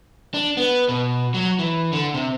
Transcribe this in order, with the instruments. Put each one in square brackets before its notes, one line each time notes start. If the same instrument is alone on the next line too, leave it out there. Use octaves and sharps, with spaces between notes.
[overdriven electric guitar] D4
B3
B2
F#3
E3
D3
C3